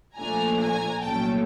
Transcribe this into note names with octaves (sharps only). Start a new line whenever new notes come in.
A#2 F3 A3 D4 G#5 A#5
G#5 A#5
C2 A#2 F#3 A3 C#4 G5 A5